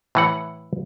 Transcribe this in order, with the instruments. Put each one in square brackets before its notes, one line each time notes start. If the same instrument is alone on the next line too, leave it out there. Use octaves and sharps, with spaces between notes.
[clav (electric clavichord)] A2 E3 F#5